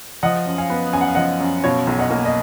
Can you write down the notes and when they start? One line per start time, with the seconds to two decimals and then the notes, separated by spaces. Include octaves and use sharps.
0.23 F3 D#5 F#5
0.46 F#2
0.58 F5 G#5
0.70 B3
0.93 F#2 G#5
1.01 F#5
1.08 F5
1.15 F3 D#5 F#5
1.41 F#2
1.64 B2 C#5 F5
1.87 B1
1.99 D#5 F#5
2.10 A#3
2.25 D#5